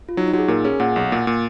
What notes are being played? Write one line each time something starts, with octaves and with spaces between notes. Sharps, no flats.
F4
F#3 D#4
D#4
F#3 F#4
G#4
A#2 A#4
C#4 G#4
A#2 F#5
B1
A#2
A#2